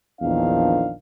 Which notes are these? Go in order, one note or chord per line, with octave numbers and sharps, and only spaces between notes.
A#1 E2 D#3 F3 D4 F5